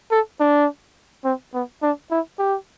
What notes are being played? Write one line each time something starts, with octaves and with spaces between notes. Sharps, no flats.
A4
D4
C4
B3
D4
E4
G4